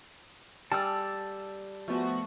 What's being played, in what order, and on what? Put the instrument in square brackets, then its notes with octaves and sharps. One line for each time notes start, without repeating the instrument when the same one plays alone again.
[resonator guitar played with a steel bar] G3 [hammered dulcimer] A4 D6 [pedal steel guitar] A5 E6
[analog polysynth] F3 B3 F#4 [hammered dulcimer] A3